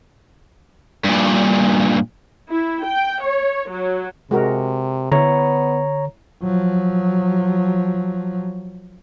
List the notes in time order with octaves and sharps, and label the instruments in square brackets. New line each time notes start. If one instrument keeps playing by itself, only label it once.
[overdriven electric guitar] G2 A#2
[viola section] E4
G5
C#5
F#3
[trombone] C3 [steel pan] G#3 F#4 A#4
[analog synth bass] D3 [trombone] B3 [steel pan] E4 [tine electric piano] C#5 A#5
[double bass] F3 F#3